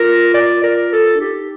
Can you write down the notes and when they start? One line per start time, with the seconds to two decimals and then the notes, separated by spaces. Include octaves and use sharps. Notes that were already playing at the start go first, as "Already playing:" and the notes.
Already playing: F4 A#4
0.34 D5
0.63 A#4
0.93 A4
1.15 D4
1.20 D#4 G4